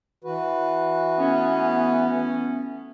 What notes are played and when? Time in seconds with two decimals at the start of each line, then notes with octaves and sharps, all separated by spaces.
0.24 E3 F#4 B4
1.18 A3 B3 C#4